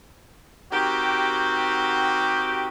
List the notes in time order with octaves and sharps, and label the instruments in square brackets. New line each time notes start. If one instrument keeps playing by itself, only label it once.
[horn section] D#3 C4 F#4 G4